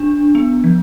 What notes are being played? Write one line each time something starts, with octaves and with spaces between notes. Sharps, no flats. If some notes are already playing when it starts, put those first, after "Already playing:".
Already playing: D4
B3
F3